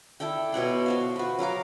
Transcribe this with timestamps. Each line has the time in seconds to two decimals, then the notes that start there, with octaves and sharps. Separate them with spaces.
0.20 E4 A4 D5 G5
0.52 B2 C#5 F#5 C6
0.86 F#4 C5 F5
1.16 F#4 B4
1.39 F#3 A#4 F5 D6